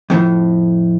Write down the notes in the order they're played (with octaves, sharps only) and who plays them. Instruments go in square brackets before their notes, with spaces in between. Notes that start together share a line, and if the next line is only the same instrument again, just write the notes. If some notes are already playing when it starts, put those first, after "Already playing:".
[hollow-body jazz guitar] F2 A2